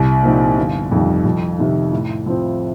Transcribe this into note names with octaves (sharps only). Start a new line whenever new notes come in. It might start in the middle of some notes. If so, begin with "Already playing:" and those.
Already playing: C2
A#2 F3 C4 D#4
G1
F2 D#3 G3
F2
C3 D#3
A2
F3 C4